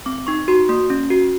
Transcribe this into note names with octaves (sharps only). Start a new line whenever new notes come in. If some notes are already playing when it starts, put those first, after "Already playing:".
C4 D6
D#4 C#6
F#4 C6
A#3 C6
C#4
F#4